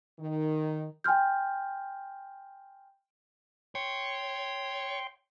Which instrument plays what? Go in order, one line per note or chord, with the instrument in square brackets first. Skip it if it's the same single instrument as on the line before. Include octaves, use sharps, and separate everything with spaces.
[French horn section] D#3
[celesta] G5 G#5 C6 F6 G6
[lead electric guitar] C#5 [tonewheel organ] G5 C6